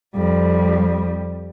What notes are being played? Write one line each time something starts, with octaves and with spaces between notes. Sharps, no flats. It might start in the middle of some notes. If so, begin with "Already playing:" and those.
F2 G3